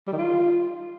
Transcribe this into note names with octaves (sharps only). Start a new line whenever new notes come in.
G3
D#3
F4